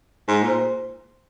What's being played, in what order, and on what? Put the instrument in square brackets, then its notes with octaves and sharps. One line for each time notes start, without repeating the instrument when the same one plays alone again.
[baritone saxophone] G#2 [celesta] C6
[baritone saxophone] A#2 [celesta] C5